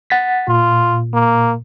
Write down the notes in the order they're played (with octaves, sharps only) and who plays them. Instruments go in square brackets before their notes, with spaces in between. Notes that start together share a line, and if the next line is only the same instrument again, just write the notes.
[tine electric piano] F#5 A6 B6
[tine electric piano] A#2 [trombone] F4
[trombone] A#3